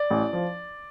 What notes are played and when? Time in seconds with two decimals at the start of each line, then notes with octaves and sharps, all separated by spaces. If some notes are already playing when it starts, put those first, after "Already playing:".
Already playing: D5
0.10 A1
0.33 F3